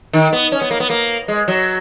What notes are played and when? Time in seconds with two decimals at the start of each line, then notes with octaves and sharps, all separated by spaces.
0.13 D#3
0.33 B3
0.52 C#4
0.62 B3
0.71 A#3
0.80 B3
0.90 A#3
1.28 G#3
1.48 F#3